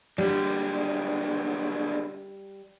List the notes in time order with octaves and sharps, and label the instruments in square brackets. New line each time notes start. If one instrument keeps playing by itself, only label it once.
[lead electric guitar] B1 D3 [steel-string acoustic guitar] G3